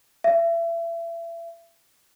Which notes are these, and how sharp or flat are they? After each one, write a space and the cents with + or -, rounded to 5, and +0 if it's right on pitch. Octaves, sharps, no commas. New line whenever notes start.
E5 +30